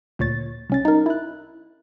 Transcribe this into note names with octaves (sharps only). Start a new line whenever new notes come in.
D2 A#2 C#5 A6
C2 C#4 A6
D#4 A#4
E4 F#6